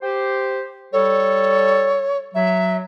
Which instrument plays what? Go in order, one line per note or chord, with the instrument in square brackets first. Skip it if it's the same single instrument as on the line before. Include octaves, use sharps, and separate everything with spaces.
[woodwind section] G4 C5
[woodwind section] G3 A4 [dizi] C#5
[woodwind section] F#3 [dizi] E5